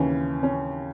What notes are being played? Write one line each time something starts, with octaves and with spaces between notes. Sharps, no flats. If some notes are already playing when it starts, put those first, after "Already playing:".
Already playing: D#2 C#3 E3 C#4
C#4